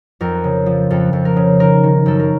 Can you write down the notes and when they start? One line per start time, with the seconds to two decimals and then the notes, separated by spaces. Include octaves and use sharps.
0.21 F2 A#4
0.44 C#3
0.66 F3
0.90 F2 A4
1.13 F2
1.25 A#4
1.36 C#3
1.59 D#3 A#4
1.83 D#3
2.06 F#2 A4
2.20 A#4